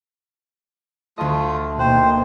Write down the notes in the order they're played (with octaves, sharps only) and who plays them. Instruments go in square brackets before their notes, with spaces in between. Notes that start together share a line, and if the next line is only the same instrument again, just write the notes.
[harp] D2 D#5 [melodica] A3 F4
[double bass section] B2 D#3 A#3 [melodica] C5 [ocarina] G5 [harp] F#6